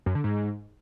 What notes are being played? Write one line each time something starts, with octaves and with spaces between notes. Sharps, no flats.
F#2
D3
G#2